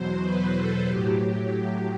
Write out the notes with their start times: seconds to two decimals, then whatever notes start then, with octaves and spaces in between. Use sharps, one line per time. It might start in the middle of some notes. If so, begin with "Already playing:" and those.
Already playing: E2 B2 F#3 C5
0.22 B4
0.54 A4
0.85 A2 F#3 G4